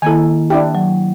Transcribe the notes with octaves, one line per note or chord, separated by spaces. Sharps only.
D#3 A#3 E4 A4 G#5
D4 E4 G4 G5
F#3